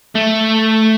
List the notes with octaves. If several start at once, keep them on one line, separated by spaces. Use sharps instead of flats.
A3